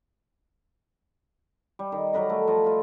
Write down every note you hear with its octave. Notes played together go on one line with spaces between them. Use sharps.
G3
D#3
F#3 A#4 B4 D#5
A3
F3 D5 D#5
F4 B4